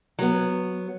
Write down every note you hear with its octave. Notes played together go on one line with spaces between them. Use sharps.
F#3 B3